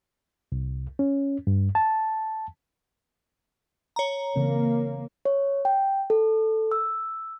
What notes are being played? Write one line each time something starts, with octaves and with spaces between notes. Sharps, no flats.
C2
C#4
G2
A5
C#5 A#5
C#3 E3 A#3 C4
C#5
G5
A4
E6